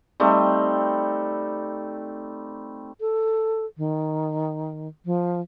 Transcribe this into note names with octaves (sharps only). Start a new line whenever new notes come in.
G3 A3 C4 D#4
A4
D#3
F3